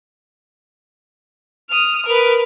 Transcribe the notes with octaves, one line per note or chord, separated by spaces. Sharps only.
D#6 F6
A#4 B4